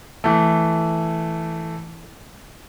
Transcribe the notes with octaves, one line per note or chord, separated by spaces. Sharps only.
E3 A3